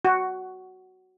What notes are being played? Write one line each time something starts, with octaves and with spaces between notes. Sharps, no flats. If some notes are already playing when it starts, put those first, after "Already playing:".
F#4